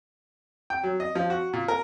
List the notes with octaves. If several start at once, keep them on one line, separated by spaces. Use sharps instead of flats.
G5
F#3
D#5
F3
F#4
A#2
A#4